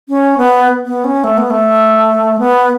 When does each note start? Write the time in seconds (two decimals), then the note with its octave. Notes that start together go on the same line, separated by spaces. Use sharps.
0.09 C#4
0.38 B3
0.86 B3
1.04 C#4
1.24 A3
1.38 B3
1.50 A3
2.39 B3